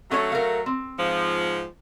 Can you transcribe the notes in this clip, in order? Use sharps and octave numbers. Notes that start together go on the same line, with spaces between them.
F#3 A3 C#4 A4 C#5
A#4 F5
C4
G#2 F3